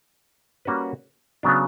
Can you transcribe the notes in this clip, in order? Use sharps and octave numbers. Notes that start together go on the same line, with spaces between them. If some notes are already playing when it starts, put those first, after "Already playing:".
G3 A#3 C#4 F#4 B4
C#3 F#3 B3 D4